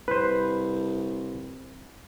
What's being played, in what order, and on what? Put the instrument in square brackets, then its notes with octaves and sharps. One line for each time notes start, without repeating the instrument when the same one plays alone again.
[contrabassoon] C2 [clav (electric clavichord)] B4 C5